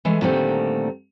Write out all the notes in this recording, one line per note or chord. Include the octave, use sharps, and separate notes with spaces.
E3 G#3 A3
A#2 D3 D#3 G3 A3 C4